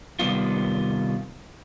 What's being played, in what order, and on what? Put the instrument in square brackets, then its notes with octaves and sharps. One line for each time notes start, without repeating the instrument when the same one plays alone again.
[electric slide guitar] C3 D#3 G3 B3 F4